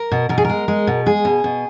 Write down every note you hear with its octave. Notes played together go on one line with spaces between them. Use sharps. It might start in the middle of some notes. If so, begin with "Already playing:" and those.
Already playing: A#4
B2
B2 A#4
G#4
A#4
G#3
G#3
B2
G#3 G#4
B2
B2